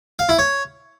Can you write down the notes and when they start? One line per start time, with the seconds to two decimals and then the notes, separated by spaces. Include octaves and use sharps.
0.19 F5
0.29 E4
0.39 C#5